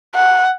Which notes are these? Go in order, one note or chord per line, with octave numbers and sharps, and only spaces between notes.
F#5